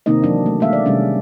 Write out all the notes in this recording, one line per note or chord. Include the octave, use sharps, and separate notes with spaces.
C3 D#3 A#3 C4 D#4 D#5
E3 F#3 D4 D#4
A3
G#3 A#3 E5 F5
D5
C3 D#3 G3 G#3 C#4 D4